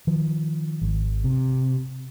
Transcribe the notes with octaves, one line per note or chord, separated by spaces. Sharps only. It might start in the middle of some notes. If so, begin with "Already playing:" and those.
D#3 F3
G#1
C3